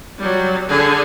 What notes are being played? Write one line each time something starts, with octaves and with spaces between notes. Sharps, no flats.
F#3 G3
D3 G#4